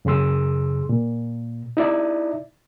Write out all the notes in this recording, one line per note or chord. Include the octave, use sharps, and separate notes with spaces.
F#2 C#3 G#4 C6 E6
A#2
D#4 E4 D5 E5